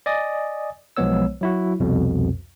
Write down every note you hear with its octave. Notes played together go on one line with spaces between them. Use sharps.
D5 D#5 G#5 D#6
B1 F3 G#3 B3 C#5 E6
F#3 E4 F#4
C2 F2 B2